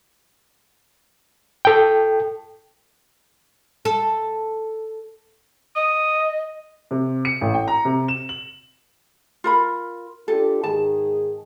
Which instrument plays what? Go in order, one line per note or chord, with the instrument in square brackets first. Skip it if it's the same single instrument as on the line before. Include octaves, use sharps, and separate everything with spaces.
[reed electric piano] A4 G5
[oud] A4
[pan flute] D#5 [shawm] D#6
[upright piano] C3
C#7
A1
G5
A#5
C3
E7
F#7
[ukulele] F4 A#4 B5
[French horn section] D4 F4 G4 [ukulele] A4
[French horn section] G#2 D#3 G#4 [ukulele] A5